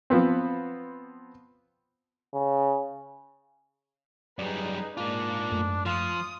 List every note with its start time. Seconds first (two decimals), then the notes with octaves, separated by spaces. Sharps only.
0.10 F3 B3 C4
2.34 C#3
4.39 F#2 G3 D#4 G#4 B4 D5
4.97 G#2 A#3 D4 F4
5.51 F#2 A3
5.86 F3 F4 D#6